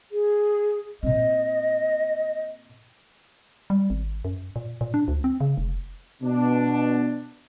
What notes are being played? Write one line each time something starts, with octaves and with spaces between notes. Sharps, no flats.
G#4
A#2 C4 D#5
G3
G#1
F#2
A#2
A#2
D4
D2
C4
C#3
F1
B2 D4